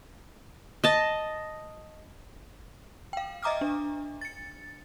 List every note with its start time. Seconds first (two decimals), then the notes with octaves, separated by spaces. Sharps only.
0.84 D#5 A5
3.13 F5 G5
3.42 D#5 E5 A#5 D6 D#6 F6
3.61 D4
4.21 A6 C#7